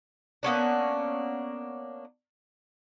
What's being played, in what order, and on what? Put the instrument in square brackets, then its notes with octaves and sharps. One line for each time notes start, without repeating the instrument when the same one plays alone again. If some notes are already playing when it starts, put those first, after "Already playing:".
[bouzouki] A#3 B3 C#4 D4